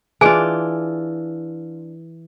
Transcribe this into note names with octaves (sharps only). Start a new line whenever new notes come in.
E3 D4 F4 G#4 G#5